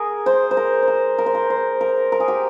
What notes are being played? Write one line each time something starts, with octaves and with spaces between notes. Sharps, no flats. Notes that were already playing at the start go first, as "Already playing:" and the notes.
Already playing: G#4 A#4
C5
C5
A#4
C5
A#4
A#4
C5
A#4
C5
A#4
A#4
G#4
G4